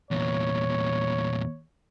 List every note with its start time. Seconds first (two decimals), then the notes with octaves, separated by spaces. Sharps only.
0.11 E2 A#2 C#5